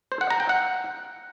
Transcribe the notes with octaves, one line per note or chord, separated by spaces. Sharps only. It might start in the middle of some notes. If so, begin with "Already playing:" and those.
C5
F#5
A#5
G5
F#5